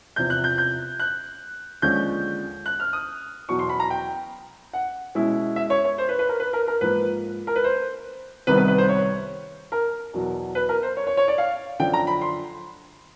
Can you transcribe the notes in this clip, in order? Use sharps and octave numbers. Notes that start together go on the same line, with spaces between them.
E2 C3 F3 G6
F#6
G6
G6
F#6
D#2 D3 F3 G#3 C#4 G6
F#6
F6
D#6
E2 B2 F#3 C#6
C6
B5
A#5
G5
F#5
B2 G#3 C#4 E4
E5
C#5
C#5
C5
B4
B4
A#4
B4
A#4
A#4
G#2 F3 A#3 B4
A#4
B4
C5
C2 C3 D#3 G3 B3 B4
B4
B4
C5
C#5
A#4
E2 B2 F#3
B4
A#4
C5
C#5
C#5
C#5
D5
F5
F#2 D3 F3 G5
A#5
B5
C6